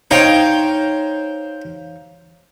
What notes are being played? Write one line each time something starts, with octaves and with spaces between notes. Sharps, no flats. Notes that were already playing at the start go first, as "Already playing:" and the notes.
D#4 C5 C#5 F5 G5